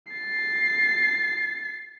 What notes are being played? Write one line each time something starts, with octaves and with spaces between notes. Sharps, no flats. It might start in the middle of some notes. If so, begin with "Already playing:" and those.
A6 C7